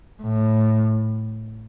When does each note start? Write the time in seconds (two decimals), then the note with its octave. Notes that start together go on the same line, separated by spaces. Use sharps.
0.22 A2